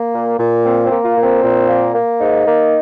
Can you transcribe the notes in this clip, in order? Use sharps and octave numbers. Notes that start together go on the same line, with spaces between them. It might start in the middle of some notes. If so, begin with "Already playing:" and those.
Already playing: A#3
A#2
A#2
A#3 C4
C4
A#3
F4
A#2
C4
A#2
A#3
A#3
G#2 D#4
A#3